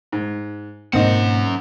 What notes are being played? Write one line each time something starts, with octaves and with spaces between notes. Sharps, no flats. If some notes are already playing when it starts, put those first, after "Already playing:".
G#2
G#2 B2 A#3 C4 C#4 D#4 F#5